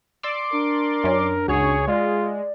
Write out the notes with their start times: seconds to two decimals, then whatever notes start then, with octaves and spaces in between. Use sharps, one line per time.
0.23 D5 C6 D6 E6
0.53 D4 A#4
1.04 F#2 C#4
1.48 C#2 F#4 G#4 C#5
1.88 G#3 F4 D5